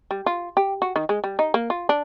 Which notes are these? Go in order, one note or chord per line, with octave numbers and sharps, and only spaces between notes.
G3
F4
G4
F#4
D#3
G#3
G3
D#4
A#3
F4
D4